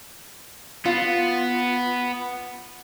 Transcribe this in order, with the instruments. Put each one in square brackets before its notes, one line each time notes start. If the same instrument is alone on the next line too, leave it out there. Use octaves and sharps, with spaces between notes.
[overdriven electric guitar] B3 [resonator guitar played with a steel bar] F4